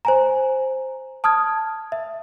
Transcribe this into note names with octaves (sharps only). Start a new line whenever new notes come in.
C5 G#5 A#5
A5 D#6 F6 G#6
E5